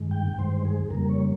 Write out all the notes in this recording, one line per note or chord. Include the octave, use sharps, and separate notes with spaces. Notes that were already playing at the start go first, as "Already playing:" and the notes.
Already playing: G2 D#3 G#3
G5
G2 D#3 G#3 C5
G#4
F2 C#3 G3 A#3 A#4
C#5